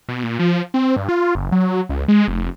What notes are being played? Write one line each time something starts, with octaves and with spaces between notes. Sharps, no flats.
B2
A#2
F3
C4
G2
F4
F#1
F#3
C#2
G#3
F1